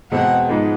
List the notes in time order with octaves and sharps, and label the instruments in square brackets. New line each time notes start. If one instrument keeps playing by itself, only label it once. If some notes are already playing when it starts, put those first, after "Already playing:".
[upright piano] E2 B2 G#3 C4 [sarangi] F#5
[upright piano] G#2 F3 G#3 B3 D#4